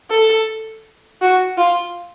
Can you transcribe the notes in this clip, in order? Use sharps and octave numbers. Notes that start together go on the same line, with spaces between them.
A4
F#4
F4